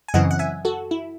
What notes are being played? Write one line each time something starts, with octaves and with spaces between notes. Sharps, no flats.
G#5
F#2 C#3 E3 C4 D#5 F#5
F#5
E5 G#5
F#4 A4
E4